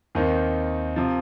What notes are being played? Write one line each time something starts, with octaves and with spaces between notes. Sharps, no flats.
D#2 D#3 C4 D#4
C3 F3